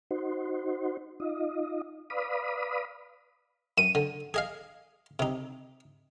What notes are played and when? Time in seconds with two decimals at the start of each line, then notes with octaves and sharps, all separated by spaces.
0.11 D#4 F#4 C5
1.20 D#4 F4 D#5
2.10 B4 D5 F5 B5 D#6
3.78 F#2 D#7
3.95 D3
4.34 G#4 D#5 F5
5.19 C3 D#4